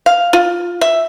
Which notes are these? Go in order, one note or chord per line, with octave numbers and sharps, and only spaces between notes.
F5
F4
E5